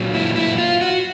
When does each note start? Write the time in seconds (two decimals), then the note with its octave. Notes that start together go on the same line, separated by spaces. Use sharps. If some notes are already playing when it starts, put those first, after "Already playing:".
Already playing: A#2 F#3
0.14 E4
0.36 E4
0.58 F4
0.81 F#4